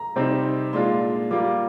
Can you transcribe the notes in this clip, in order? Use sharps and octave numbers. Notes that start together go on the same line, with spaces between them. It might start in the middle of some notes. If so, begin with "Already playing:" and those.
Already playing: A#5
C3 G3 C4 D#4
A#2 G#3 D4 F4 C6
G3 A#3 F4 D6